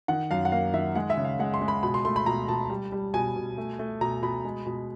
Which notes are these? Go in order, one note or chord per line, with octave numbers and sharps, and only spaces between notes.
D#3 F#5
F#2 F5
F#5
A#3 F5
D#3 E5
G#3 F#5
E5
C#3
F5
G#3 F#5
C6
G#3
B5
B2 B5
C6
A3 C6
B5
B2 A#5
B2 A5
G3
G3
B2 G#5
B2
A3
A3
B2 A#5
B2 B5
G#3
B2